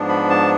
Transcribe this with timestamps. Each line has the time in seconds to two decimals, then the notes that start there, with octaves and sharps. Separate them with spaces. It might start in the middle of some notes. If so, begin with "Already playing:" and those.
Already playing: G#2 F3 B3 D4
0.09 B5
0.30 A5